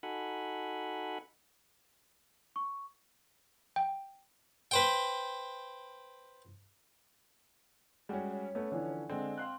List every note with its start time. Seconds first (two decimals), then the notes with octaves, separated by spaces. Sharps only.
0.03 D#4 F#4 A4 F#5 G#5 B5
2.56 C#6
3.76 G5
4.71 B4 C5 G5
8.09 G3 G#3 C#4 F#4
8.29 C#5
8.55 A3 B3 C#4
8.72 D3 E3 F3
9.10 D3 G#3 C4 D#5
9.38 F5 C6 F#6